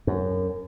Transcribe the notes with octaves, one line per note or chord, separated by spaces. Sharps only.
F#2